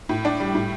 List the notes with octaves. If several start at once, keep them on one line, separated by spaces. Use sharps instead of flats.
A2
D4
G3
A2